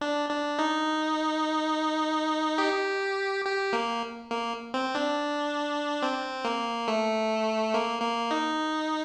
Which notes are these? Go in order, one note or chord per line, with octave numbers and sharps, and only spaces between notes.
D4
D4
D#4
G4
G4
A#3
A#3
C4
D4
C4
A#3
A3
A#3
A#3
D#4